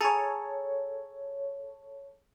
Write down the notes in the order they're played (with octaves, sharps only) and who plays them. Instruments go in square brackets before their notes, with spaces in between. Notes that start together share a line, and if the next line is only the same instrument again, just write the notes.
[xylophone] G#4 G#5 A#5 [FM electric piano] A4 C#5